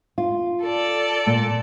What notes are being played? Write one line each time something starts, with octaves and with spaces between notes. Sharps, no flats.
F4
A4 D5
A#2 A#3